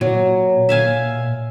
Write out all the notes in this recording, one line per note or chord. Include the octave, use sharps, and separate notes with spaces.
A#2 F#3
E5 F5 G#5